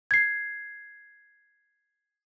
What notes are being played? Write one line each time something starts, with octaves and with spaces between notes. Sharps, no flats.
G#6 C7